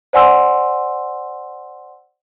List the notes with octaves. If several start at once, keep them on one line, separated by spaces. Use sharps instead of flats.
C5 D5 F#5 G#5 C6 E6